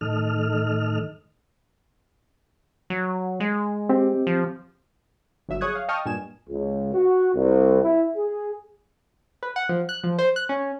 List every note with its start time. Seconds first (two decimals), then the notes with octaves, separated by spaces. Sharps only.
0.01 A2 D#3 A4 D#5 F6
2.90 F#3
3.40 G#3
3.89 C4 G4
4.27 F3
5.49 G1 F#3 E5 E6
5.61 G#4 C#5 C#6 D#6 F#6 G#6
5.75 F5
5.88 D#5 G5 A5 C#6 D#6 F6
6.05 G2 A#2 G#5 E7
6.49 C#2
6.93 F#4
7.34 C2
7.82 E4
8.16 G#4
9.43 B4
9.56 F#5
9.69 F3
9.89 F#6
10.04 F3
10.19 C5
10.36 F#6
10.49 C#4